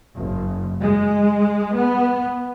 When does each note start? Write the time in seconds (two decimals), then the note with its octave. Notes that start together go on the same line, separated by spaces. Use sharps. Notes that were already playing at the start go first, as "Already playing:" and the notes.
0.18 F#1
0.78 G#3
1.72 B3